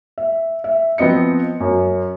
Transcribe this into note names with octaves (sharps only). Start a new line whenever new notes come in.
E5
E5
F3 B3 C4 D#5 C#7
F#2